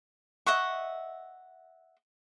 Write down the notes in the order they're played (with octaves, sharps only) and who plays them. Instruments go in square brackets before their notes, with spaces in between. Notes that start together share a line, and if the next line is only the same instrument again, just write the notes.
[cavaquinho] D#5 E5 F#5 C#6